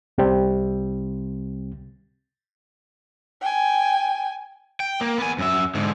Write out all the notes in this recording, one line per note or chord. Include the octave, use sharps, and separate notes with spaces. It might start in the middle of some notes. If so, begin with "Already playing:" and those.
C2 C3 G3 C4
G5 G#5
G5
A#3
B3 G#5
F#2 E5
G#2 D3